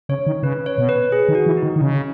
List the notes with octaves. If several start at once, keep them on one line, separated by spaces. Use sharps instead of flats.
C#3 C#5
D#3
C#3 B4
C#5
B2
B4
G#4
D#3
F#4
E3
D#4
D#3
D#3
C#3